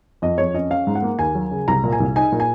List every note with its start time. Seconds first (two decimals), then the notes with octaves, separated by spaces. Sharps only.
0.22 F2 D#5
0.38 F2 C#5
0.54 C#4 D#5
0.70 C#4 F5
0.87 G#2
0.95 F#5
1.03 A#3
1.19 D#2 G#5
1.35 F#3
1.51 C#3
1.68 C2 A#5
1.84 A#2
1.92 G#5
2.00 C2
2.16 D#4 G#5
2.32 A#2
2.40 G#5